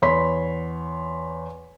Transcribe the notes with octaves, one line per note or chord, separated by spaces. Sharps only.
E2 C#5 B5 C6 B6